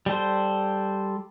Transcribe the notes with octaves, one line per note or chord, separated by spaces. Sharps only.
G3 A4 C5